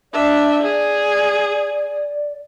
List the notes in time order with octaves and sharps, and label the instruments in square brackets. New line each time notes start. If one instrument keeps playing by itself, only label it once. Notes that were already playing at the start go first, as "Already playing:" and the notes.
[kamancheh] D4 E5 [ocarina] D5
[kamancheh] G#4